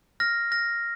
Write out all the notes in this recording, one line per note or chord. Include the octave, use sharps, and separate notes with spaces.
F6 A#6
F6 A#6